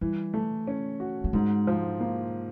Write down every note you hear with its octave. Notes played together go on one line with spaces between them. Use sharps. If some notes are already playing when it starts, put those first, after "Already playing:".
E3 G3
A3
C#4
F#4
A3
G#2 G#3
F3
A#3